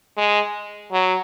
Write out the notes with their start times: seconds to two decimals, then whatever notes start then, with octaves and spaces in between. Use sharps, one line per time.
0.17 G#3
0.92 F#3